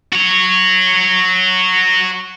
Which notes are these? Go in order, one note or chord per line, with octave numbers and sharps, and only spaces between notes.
F#4 C#5